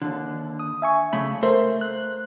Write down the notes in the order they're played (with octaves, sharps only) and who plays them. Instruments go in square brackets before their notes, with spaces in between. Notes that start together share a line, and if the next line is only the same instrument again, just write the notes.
[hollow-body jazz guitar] D#2 D3
[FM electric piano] D#6
E5 G#5 C#6
[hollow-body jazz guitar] C#3 A3 B5
[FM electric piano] A3 A#4 E5 [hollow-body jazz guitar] C5
[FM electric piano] F#6